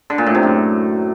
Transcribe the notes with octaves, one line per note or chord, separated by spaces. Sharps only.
D3
A#2
A2
C3
F#2